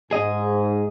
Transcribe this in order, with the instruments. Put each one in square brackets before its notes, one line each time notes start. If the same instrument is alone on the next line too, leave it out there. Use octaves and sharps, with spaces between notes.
[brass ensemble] G#2 [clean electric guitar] G#4 D#5